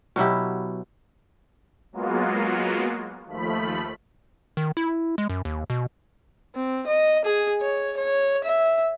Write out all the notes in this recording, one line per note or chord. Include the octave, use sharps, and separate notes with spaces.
B2 F#3 E4 G4
F#3 G#3 A#3 B3 F4 F#4
D#2 F3 A3 B5
D#3
E4
G#3
F#2
D#2
B2
C4
D#5
G#4
C#5
C#5
E5